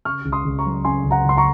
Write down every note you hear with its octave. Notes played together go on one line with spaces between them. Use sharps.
C#3 C#6 F6
C#2
C6 D#6
C#2
A#5 C#6
F#3
C#3 G#5 C6
C#2
F#5 A#5
C#2 C6
A#5 C#6